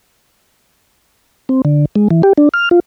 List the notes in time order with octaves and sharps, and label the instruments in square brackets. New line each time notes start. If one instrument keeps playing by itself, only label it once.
[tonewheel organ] C4
D3
G#3
E3
G4
D4
F6
F4